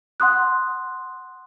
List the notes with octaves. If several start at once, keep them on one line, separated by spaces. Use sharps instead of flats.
F#5 C6 D#6 F#6